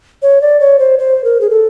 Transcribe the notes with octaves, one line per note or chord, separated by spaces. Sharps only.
C#5
D5
C#5
C5
C5
A#4
G#4
A4